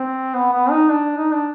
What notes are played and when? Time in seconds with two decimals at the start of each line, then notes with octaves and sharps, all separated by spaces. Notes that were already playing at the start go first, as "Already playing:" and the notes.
Already playing: C4
0.34 B3
0.53 B3
0.70 D#4
0.89 D4
1.17 D#4
1.32 D4